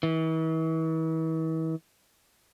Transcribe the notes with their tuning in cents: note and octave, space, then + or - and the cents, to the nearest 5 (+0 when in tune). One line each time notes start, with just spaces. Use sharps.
E3 -40